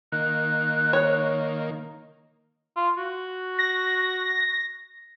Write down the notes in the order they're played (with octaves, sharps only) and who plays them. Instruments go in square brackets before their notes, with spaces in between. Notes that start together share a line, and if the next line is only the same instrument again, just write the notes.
[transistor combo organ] D#3 A#3 [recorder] F#6
[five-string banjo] C#5
[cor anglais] F4
F#4
[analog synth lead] A#6